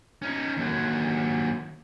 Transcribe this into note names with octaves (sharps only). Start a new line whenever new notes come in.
C#4 D#4
D#2 F#3